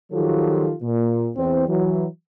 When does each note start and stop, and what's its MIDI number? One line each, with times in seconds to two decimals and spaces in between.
0.13 0.73 51
0.13 0.73 53
0.13 0.73 54
0.13 0.73 65
0.13 0.73 67
0.13 0.73 69
0.82 1.29 46
1.36 1.65 40
1.36 1.65 60
1.68 2.05 52
1.68 2.05 54